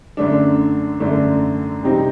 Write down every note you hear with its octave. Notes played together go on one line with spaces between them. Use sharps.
F#2 D3 A3 D4
F#2 D3 A3 D4
C3 G3 C4 D#4